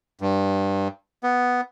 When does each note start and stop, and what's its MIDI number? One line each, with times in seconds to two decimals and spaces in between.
0.21 0.88 43
1.23 1.61 59